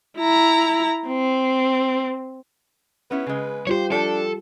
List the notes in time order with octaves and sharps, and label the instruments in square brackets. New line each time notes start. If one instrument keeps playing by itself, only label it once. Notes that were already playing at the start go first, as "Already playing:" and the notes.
[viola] E4 A#5
C4
[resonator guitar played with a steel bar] B3 C#4 E4 [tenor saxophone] B4
[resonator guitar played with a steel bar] C#3 G#3
[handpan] G3 F4 G4 [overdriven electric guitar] C5 C#5
[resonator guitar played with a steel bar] F3 G5 [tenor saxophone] D4 [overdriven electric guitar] A4